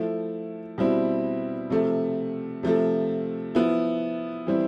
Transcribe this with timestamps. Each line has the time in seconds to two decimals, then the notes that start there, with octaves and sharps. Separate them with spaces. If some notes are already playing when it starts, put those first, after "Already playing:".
Already playing: F3 A3 E4
0.78 B2 G3 C4 E4
1.70 C3 F3 A3
2.63 C3 F3 A3
3.55 F3 B3 E4
4.47 E3 G3 C4 E4